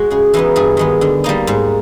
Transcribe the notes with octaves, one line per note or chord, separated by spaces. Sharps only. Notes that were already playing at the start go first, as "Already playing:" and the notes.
Already playing: G#3 F#4
C#3 G#4
E3 G#3 B3 D#4
G2 G#4
D#3 G#3 B3
D3
G3 A#3 D#4
G#2